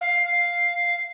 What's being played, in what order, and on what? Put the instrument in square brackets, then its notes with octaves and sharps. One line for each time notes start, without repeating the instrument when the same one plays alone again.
[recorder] F5